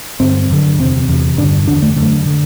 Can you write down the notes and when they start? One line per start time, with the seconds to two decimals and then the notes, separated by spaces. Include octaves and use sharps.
0.20 G2 D3 C4
0.50 F#2 D3
0.79 E2 C3 C4
1.09 E2 C3
1.38 G2 D3 D4
1.67 D3 D4
1.70 E2
1.82 A3
1.96 F#2 D3 A3
2.26 D3